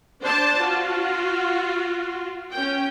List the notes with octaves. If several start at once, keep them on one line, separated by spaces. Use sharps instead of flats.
D4 C5 D5 A5
F4 F#4
C#4 G5